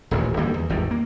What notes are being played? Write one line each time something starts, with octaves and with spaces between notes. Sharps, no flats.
D#1 A1 D#2
D2 E3 G3 A#3
E2
G#1 E2 A2 G3
A#3